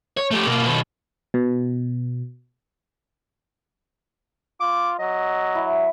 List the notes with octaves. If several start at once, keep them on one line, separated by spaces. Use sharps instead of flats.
C#5
A3 G4
B2 A#3
B2 D#3
B2
F4 D6
F#3 D#5
E4